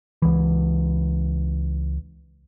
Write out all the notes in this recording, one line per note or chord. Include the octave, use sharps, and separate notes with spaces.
C#2 E3